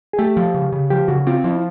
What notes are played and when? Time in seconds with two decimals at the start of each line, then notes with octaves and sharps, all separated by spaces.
0.13 G#4
0.19 A3 G4
0.37 F3
0.54 C#3
0.73 C#3
0.90 F3 G4
1.08 C#3 F#4
1.27 C4 F4
1.44 F3 E4